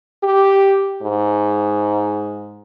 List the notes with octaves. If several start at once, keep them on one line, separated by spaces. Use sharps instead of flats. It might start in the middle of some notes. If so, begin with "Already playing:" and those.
G4
G#2